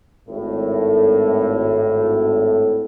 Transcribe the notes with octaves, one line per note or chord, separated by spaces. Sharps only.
G#1 A2